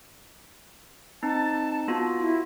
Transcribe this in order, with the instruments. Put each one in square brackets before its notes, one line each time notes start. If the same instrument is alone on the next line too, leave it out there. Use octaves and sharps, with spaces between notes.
[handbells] C4 D#4 [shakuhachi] A5
[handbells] B3 F4 F#4
[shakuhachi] E4